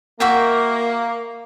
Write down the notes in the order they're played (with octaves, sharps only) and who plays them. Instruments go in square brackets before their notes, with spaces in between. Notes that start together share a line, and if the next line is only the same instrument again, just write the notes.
[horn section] A#3 [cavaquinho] F#4 E5 G5